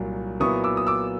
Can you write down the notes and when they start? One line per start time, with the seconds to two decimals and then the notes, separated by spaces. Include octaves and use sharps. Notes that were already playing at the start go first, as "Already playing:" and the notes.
Already playing: C2 A#2 F#3
0.40 A#2 F#3 B3 E4 C#6 D#6
0.64 D6 E6
0.77 D#6
0.87 D6 E6